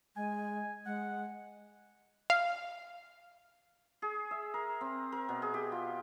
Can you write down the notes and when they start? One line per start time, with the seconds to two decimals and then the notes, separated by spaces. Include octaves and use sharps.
0.16 G#3 G#5
0.86 G#3 F#5
2.30 F5
4.02 G#4
4.31 E5
4.54 A#4
4.81 C4
5.12 A#4
5.29 B2
5.42 G#4
5.54 G4
5.72 F4